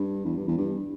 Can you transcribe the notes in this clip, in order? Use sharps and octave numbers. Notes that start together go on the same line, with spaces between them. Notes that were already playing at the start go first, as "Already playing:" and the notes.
Already playing: G2
E2
G2
E2
G2